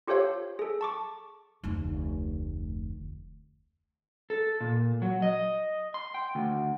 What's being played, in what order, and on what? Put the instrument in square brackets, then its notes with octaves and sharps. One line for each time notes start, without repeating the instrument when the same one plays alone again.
[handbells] F4 G4 A4 C5 C#5 F5
G#4 A4
A5 C#6 D6
[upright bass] F1 D2
[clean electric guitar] A4
A#2
F#3
D#5
C6
G5
D2